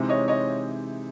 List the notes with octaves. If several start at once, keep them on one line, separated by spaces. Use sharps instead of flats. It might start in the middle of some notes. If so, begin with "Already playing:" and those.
Already playing: C3 E3 G#3 C4 D#4
C#5 D#5
C#5 D#5